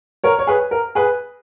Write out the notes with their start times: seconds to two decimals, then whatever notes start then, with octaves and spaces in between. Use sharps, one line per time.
0.24 A#4 C#5
0.39 C#5
0.47 G#4 B4
0.71 A#4
0.95 G#4 B4